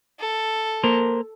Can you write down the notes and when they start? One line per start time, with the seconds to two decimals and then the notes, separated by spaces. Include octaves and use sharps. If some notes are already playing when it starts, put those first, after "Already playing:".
0.20 A4
0.84 A#3 A#4 C5